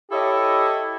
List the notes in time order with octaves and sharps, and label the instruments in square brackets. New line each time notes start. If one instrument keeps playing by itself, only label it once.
[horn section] E4 G4 A4 C#5 D#5 E5